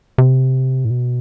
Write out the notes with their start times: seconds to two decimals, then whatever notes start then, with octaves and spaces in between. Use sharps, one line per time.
0.18 C3
0.85 A2
0.90 B2